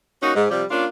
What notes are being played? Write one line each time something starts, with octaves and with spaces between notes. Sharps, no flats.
A#3 C#4 D#4 F#4
G#2
C3 F3 G3
A#3 C#4 D4 F4